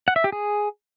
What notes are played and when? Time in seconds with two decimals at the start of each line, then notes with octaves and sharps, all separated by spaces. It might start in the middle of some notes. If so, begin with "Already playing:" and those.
0.08 F#5
0.16 E5
0.24 G4
0.32 G#4